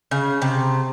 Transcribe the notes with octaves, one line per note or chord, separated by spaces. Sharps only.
C#3
C3